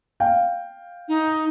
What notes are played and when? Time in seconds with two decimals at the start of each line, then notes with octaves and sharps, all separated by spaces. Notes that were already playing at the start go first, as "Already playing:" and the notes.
0.20 F5 G5
1.08 D#4